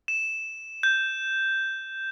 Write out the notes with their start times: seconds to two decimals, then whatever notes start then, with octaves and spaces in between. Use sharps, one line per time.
0.08 E7
0.83 G6